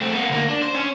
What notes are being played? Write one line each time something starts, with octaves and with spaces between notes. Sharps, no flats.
A3 C4
A#3 B3
D2 A#3
D4
C5
C#4